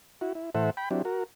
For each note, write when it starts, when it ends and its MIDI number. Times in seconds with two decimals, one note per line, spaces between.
0.21 0.33 64
0.21 0.33 66
0.35 0.50 64
0.55 0.70 45
0.55 0.70 52
0.55 0.70 69
0.55 0.70 72
0.55 0.70 76
0.55 0.70 78
0.77 0.89 79
0.77 0.89 83
0.91 1.02 54
0.91 1.02 60
0.91 1.02 62
0.91 1.02 64
0.91 1.02 67
1.05 1.24 66
1.05 1.24 70